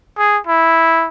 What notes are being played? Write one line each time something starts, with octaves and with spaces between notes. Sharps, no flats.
G#4
E4